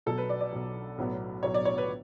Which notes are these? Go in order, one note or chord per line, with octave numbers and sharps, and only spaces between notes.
B1 B2 F#3 A4
B4
D5
D5
B1 B2 F#3
B1 A2 F#3 B3
B1 A2 F#3 B3 C#5
D5
C#5
B4